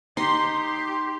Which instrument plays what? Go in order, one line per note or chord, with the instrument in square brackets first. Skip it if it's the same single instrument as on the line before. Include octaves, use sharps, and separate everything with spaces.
[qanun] D#4 [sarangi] G4 [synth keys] C6